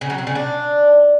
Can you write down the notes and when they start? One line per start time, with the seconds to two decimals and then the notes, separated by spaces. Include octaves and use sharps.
0.01 C#3
0.10 F#3
0.18 C4
0.27 C#3
0.35 D4